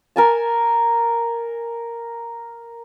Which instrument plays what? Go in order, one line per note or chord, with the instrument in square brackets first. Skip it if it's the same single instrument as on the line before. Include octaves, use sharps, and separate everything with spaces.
[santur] A#4 G#5 A5